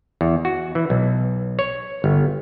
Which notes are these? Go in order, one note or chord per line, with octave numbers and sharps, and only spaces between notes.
E2
F#4
E3
B1
C#5
G1